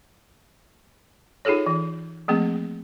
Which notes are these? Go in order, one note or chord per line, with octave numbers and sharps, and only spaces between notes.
D#4 F4 G#4 A4 C#5
E3
F3 A3 A#3 C4 G#4